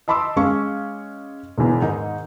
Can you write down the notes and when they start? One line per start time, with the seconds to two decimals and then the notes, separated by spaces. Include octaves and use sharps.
0.08 D#5 A5 B5 C6 D6 E6
0.36 G#3 C#4 F5 C#6
1.58 E1 E2
1.82 G#2 D#3 D#4